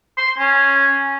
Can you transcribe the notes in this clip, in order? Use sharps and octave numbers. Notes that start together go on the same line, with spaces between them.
C6
C#4